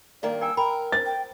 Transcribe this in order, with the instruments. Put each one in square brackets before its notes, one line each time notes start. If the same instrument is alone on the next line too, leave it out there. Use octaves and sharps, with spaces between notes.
[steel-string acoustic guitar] G2 D#3 A#3 [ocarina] D5
[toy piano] D5 G5 G#5 [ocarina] E6
[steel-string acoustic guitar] A#4 [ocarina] G5 [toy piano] B5
[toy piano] C5 [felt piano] A6
[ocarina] G5